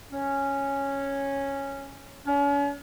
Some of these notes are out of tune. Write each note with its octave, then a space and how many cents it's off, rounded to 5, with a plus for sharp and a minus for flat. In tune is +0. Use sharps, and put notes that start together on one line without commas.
C#4 -5
C#4 +40